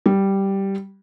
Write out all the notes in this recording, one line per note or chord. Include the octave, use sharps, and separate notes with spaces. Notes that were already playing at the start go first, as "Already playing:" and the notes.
G3